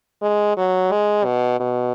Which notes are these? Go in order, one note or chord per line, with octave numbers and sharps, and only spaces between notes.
G#3
F#3
G#3
B2
B2